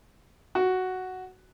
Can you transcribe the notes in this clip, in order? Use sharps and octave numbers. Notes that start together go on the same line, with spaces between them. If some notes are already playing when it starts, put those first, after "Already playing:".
F#4